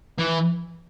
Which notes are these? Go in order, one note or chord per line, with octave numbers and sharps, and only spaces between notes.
E3